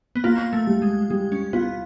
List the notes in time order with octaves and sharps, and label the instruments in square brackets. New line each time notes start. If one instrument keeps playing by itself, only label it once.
[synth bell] B3
[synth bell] A#3 [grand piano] F4
[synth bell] A3
[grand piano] G3
[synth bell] G#3
[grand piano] G3 [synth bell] G#3
[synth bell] C#4
[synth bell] B3 [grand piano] F4